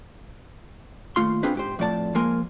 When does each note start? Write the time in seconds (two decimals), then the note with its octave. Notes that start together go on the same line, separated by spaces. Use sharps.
1.16 D#2 A3 F4 C6
1.43 C4 D4 F4 G#4 B4 C5
1.55 G#2 G4 C5
1.79 F2 A2 D5 A5
2.15 F3 G#3 A#3 A#4 G#5 C6